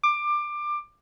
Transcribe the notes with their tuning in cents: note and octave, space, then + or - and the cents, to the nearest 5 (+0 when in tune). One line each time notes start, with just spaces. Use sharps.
D6 +20